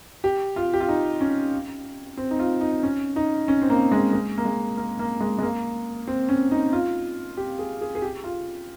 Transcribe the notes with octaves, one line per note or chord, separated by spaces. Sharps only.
G4
F4
G4
F4
D#4
C#4
C4
D#4
F4
D#4
C#4
D#4
C#4
C4
A#3
G#3
G#3
A#3
G#3
A#3
A#3
G#3
G#3
A#3
C4
C#4
D#4
F4
G4
G#4
G#4
G#4
G4
F4